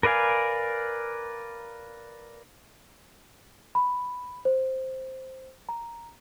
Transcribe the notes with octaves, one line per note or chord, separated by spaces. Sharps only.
A#4 B4 D5 F5 G#5
B5
C5
A#5